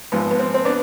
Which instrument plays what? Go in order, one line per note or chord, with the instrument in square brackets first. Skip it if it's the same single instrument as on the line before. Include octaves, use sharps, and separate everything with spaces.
[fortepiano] G#1 G#2 F3 B3
B3
C4
C4
B3 D4